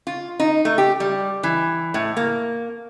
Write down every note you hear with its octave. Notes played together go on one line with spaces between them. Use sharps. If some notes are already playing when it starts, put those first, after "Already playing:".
F4
D#4
A3
G4
G3
E3
A2
A#3